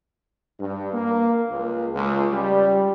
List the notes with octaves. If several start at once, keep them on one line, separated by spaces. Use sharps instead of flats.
G2
A#3
C#2
C#2
G3